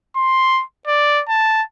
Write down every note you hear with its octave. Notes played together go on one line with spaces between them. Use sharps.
C6
D5
A5